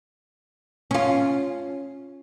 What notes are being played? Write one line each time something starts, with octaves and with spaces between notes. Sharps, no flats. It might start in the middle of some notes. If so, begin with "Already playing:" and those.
C#4 F4